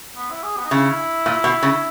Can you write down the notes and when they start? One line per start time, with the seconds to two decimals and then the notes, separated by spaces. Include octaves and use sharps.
0.16 B3
0.30 E4
0.43 G#4
0.57 B3
0.65 D#4
0.71 C#3 E4
1.26 A#2
1.44 B2
1.63 C#3